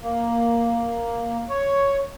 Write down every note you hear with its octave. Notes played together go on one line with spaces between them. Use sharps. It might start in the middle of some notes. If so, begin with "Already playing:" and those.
A#3
C#5